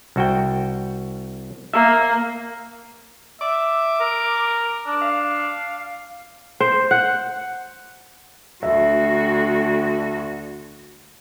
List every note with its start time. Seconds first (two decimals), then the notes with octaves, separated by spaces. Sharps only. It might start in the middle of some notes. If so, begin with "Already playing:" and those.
0.16 C2 F#4 G5
1.73 A#3 E5
3.41 E5 D6
4.00 A#4
4.87 D4
5.02 F5
6.60 C5
6.91 F#5
8.63 D2 F#4 E5